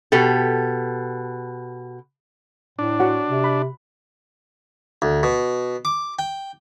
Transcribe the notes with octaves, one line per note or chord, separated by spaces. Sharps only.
B2 G4 A4
A2 D4
F#4 C#5 F#5
C3
B5
D2
B2
D6
G5